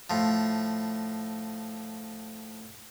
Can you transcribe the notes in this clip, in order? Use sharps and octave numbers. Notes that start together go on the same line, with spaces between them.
A2 F3